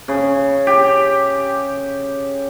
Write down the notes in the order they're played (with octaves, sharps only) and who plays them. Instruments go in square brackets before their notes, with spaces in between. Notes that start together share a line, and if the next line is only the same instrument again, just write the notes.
[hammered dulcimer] C#3
G4